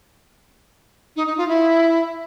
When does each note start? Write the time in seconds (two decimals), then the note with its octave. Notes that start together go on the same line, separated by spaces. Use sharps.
1.16 D#4
1.27 D#4
1.37 F4
1.48 E4